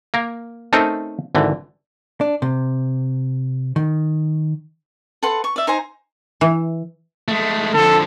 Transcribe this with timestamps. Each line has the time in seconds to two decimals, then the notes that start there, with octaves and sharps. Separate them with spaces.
0.14 A#3 A#4
0.73 A3 C4 C#4 D#4 A4 A#4
1.35 G#1 D3 E3
2.21 D4
2.42 C3
3.76 D#3
5.23 A4 B4 F#5 C6
5.44 C#6
5.56 D5 E5
5.67 D#4 C5 G#5 A#5
6.41 E3
7.28 G#3 A3
7.74 D3 F3 A4